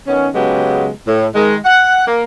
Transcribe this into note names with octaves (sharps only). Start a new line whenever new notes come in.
D#3 B3 C#4
C#3 F#3 G#3 B3 G4
A2
D#3 G#3
F#5
A#3